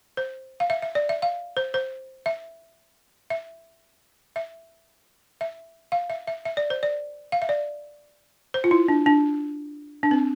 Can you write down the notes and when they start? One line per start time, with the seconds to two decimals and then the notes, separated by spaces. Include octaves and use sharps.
0.17 C5
0.60 F5
0.70 E5
0.82 E5
0.95 D5
1.09 E5
1.22 F5
1.57 C5
1.74 C5
2.26 E5
3.30 E5
4.36 E5
5.41 E5
5.92 F5
6.10 E5
6.28 E5
6.45 E5
6.57 D5
6.70 C5
6.83 D5
7.32 F5
7.42 E5
7.49 D5
8.54 C5
8.64 F4
8.71 E4
8.88 D4
9.06 D4
10.03 D4
10.11 C4